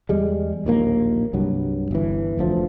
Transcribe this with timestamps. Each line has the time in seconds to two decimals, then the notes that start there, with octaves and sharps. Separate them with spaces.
0.09 E2 G3 G#3
0.65 D1 A#1 D#2 A#3
1.33 C2 G2 F#3
1.91 G1 E3
2.37 F1 D2 F3